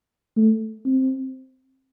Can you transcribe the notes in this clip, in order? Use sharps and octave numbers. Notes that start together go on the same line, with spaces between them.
A3
C4